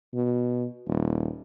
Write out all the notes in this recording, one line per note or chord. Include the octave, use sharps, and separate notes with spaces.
B2
D#1